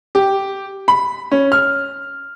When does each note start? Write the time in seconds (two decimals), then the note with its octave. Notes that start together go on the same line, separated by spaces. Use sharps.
0.15 G4
0.88 B5
1.32 C#4
1.52 F6